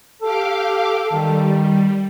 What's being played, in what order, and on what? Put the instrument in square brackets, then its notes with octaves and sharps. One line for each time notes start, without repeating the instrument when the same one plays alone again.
[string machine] G4 F5 D6 [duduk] A4
[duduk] D#3 [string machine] G3